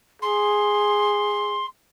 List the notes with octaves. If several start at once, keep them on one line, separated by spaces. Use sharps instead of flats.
G#4 C6